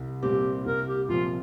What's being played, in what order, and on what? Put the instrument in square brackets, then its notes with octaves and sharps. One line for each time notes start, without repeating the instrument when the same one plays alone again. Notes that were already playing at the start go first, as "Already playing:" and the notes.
Already playing: [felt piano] C2
[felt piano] A#2 G3 C4 [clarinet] G4
[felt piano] C2 [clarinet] A#4
[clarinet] G4
[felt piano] A#2 F3 C4 [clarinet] F4